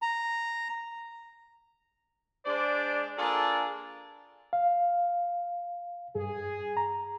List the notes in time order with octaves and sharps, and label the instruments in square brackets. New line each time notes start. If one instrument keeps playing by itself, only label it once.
[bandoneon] A#5
[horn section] G#3 D4 C5 D5
A#3 D4 F4 G#4 A4
[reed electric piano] F5
[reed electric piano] G2 [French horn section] G#4
[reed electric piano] A#5